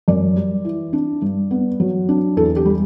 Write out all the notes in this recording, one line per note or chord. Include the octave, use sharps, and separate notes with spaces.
F#2 D5
G3
E3
D4
G2
B3
F#3
D4
E2 A4
G4
G3